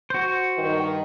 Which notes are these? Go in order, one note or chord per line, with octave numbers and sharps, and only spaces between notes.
F#4 C5
G2 D#3